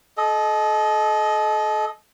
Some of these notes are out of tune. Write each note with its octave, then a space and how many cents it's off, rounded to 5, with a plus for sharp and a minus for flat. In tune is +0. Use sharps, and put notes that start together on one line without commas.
A4 -35 D#5 +0